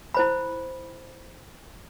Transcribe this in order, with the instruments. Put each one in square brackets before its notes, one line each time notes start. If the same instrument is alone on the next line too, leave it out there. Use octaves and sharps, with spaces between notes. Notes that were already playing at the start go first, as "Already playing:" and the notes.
[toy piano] E4 C5 B5